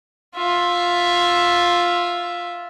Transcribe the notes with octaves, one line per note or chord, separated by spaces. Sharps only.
F4 E5